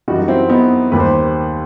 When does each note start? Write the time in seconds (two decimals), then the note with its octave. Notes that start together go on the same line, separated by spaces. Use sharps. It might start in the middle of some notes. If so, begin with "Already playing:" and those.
0.08 F#2 E3 G3 D#4 F#4
0.19 D#4
0.28 C4 E4
0.50 B3 D#4
0.92 D#2 D#3 G3 G4 B4
1.00 C5